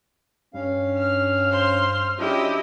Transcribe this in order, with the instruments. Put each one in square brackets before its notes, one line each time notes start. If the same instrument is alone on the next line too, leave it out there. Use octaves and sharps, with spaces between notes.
[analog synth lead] G2 [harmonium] C#4 F5
[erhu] F6
[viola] C5 C6
[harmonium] F#3 C#4 D4 [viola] E4 G4 [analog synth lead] F4 [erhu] D#5